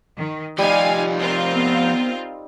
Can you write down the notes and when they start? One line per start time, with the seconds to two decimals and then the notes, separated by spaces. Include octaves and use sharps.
0.17 D#3
0.58 F3 G3 D#4 F4 G4 F5 G#5
1.20 C4 F4 A#4
1.53 B3